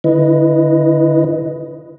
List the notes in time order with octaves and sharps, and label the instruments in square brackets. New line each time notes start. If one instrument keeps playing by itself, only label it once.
[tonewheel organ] D3 E4 B4 D#5